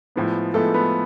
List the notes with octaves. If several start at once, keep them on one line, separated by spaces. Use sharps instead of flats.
A2 F3 G#3 B3
A2 F3 G#3 A3 B3 A4
B3 B4